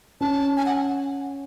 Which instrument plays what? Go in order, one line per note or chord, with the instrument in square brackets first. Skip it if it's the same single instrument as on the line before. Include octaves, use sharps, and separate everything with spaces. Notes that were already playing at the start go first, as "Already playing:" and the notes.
[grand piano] C#4 [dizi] A5
[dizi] G#5
F#5